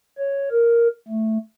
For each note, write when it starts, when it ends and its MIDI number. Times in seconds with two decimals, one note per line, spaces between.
0.18 0.49 73
0.51 0.88 70
1.08 1.38 57